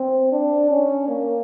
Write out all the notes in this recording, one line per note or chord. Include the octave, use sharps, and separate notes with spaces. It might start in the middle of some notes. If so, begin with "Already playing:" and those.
Already playing: C4
D4
C#4
A#3